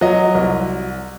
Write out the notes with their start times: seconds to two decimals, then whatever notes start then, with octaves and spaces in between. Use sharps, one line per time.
0.01 F#3 D#5
0.35 C2